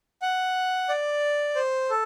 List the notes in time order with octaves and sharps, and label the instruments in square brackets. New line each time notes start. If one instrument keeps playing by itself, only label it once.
[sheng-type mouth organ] F#5
D5
C5
A4